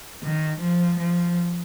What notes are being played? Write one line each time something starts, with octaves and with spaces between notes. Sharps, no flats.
D#3
F3
F3